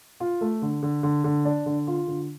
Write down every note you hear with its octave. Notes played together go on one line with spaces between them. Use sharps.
F4
A3
D3
D3
D3
D3
D4
D3
F4
D3